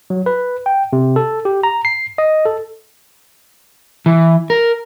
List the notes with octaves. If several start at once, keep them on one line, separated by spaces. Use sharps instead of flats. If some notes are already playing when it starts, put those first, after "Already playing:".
F#3
B4
G5
C3
A4
G4
A#5
C7
D#5
A4
E3
A#4